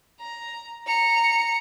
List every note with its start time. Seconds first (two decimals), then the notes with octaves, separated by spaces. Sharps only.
0.20 A#5
0.86 A#5 C#7